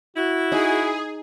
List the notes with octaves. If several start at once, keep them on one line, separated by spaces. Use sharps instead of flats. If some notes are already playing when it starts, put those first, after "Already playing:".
E4 F#4
D#4 G#4